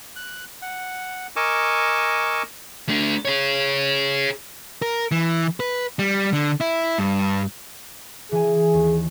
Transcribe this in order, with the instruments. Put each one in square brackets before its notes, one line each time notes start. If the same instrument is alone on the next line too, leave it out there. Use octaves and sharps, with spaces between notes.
[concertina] F#6
F#5
A#4 D#5 G#5 C#6 D6 E6
[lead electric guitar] A3 D4
G#4 C#5
[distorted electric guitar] A#4
E3
B4
G3
D3
E4
G2
[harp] E3 G#5 [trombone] G#4
[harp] D#2